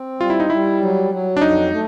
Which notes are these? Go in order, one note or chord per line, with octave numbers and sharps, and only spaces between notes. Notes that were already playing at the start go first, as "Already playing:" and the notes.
Already playing: C4
G3 F4
E4
D#4
G3 E4
F#3
F#3
D4
F2 D#4
A3